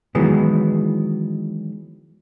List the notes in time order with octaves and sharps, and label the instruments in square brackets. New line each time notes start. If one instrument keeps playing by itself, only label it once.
[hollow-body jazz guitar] D#3 E3 F#3 G#3 B3